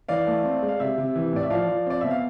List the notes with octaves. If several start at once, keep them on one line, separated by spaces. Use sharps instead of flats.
E3 D5 F5
A3
C4
G#3
F5
C3 E5
C3
E3
A2 D5
E5
F3 D5 F5
F3
C4 D5
B2 E5
F5